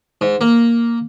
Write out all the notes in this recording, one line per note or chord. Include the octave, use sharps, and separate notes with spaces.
G#2
A#3